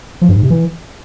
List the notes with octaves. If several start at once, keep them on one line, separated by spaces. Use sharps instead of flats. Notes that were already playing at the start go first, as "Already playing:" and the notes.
F3
G2
G#2
C3
E3